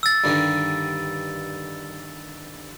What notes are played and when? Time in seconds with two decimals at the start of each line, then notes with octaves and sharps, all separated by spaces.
0.03 E6 A6
0.24 G2 D3 D#3